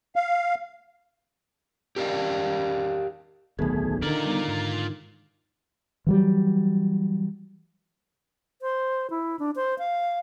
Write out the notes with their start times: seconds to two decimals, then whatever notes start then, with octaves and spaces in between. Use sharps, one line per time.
0.16 F5
1.96 G4 A#4 C5 D5 F5
3.59 D1 B1 D#3 A3 B3 G#4 B4
4.02 D3 D#3 F4 D5 A#5
4.25 G3 B3 D#4
4.48 G#2
6.07 E3 F#3 G3
8.62 C5
9.10 E4
9.39 D4
9.56 C5
9.79 F5